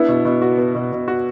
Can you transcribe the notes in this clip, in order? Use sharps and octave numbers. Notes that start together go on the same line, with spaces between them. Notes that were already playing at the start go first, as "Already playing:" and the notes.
Already playing: B3 D4 E4
B2
B2
F#4
B3
B2
B2
F#4